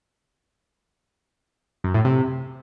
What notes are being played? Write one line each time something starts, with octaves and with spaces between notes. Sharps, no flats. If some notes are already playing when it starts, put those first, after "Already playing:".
F#2
A2
C3